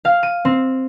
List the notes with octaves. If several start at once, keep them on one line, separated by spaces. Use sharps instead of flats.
F5
D#7
C4